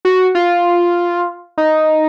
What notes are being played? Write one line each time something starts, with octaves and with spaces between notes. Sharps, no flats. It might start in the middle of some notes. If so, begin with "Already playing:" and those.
F#4
F4
D#4